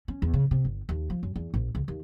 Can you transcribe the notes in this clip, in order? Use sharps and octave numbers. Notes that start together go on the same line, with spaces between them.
C#4
E2
C#3
C3
G1
D#2
F3
F#2
E2
A#1
C#2
D#2